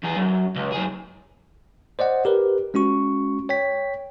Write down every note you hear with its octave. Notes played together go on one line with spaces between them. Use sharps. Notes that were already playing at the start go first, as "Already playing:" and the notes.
E2 G#4
F#2
C#2
F#2 G#4
C5 D5 D#5 F#5
G4 A#4 B4
G#3 C#4 F#4 C#6
C#5 G5 B6